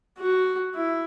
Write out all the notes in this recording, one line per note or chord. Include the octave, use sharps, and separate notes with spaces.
F#4
E4